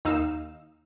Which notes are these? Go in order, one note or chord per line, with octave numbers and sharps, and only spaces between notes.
D#2 D#4 F5 E6 E7